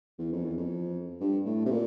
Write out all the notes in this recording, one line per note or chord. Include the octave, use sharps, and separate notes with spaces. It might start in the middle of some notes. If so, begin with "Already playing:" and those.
E2
F2
E2
F2
G2
A2
C3
A#2